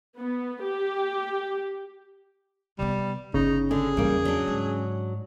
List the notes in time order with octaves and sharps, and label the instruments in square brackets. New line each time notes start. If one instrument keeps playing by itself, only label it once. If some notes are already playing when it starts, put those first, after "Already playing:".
[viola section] B3
G4
[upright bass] C3 B3 [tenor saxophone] G3
[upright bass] G1 [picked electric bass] C#3 [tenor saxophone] D#4
[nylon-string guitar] D3 [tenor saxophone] G#4
[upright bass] E2 G2 [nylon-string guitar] G3 A#3
[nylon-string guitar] F#3 D4
[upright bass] G#2